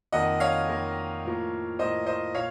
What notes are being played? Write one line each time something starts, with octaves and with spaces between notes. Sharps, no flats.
F2 D#3 A#3 D#5 F#5
C#5 F5
F2 D#3 A#3
A2 F3 A#3
A2 F3 A#3 C5 D#5
C5 D#5
A#2 C#5 F5